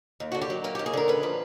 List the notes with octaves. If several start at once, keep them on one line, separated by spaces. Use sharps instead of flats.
D#2
D3 F#4
G4
F#3
A#3 G4
D#2 G4
G#4
D3 A#4
C#3 B4
F3